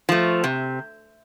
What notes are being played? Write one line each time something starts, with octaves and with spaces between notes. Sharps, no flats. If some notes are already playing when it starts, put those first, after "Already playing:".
F3 A3
C3